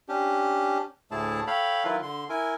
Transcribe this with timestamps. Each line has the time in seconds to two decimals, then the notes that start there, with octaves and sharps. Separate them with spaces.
0.09 C#4 D4 G4
1.11 D2 A2 A3 E4 G#4 A5
1.47 A4 C#5 F5 G5 B5
1.85 D#3 F#3 E4 F4 B4
2.02 D3 C6
2.30 E4 A#4 G#5